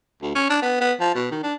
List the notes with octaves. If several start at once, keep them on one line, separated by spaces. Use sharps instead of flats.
D2
C#4
D4
B3
B3
F3
B2
D#3
D4